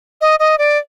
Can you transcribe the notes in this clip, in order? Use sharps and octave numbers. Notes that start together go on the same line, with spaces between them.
D#5
D#5
D5